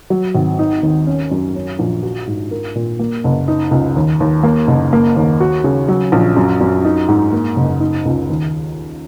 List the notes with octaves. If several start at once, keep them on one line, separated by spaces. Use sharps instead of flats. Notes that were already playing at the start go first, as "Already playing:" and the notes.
F#3
G#1
D#4
D#2
C#4
F#2
C#4
A#1
F#4
G#2
A#4
A#2
A#3
F#1
D#4
C#2
D#2
D#2
A#3
F#1
A#3
D#2
F#4
C#3
F#3
A#1
F#2
F#2
D#4
G#2
A#3
F#1
D#4
C#2
D#2